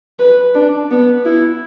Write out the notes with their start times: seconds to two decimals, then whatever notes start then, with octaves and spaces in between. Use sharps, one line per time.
0.19 B4
0.54 D4
0.91 B3
1.25 E4